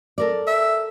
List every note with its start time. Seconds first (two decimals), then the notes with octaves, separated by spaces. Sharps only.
0.18 A4 A#4 D5
0.47 E5